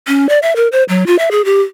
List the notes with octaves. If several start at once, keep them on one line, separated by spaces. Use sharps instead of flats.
C#4
D5
E5
A#4
C5
F#3
F4
E5
G#4
G4